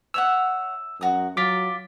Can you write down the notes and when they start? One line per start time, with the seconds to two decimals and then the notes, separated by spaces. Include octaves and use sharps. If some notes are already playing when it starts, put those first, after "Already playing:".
0.14 C#5 E5 F#5 E6
1.01 F#2 F#4 D#6
1.37 F#3 F4 D6 B6